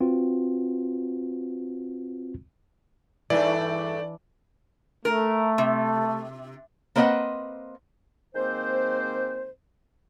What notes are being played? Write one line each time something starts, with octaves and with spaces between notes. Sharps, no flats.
C4 F4 F#4 B4
E2 G2 E3 A3 D4 D5
A3 A#4
C3
A#3 C4 B4 D#5 E5 F#5
D#3 G#3 A#3 C4 C5